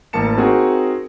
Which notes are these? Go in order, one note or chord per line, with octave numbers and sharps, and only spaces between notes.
A1 A#3 A#4 A5 C#7 E7
C4 D#4 F#4 G#4 A#4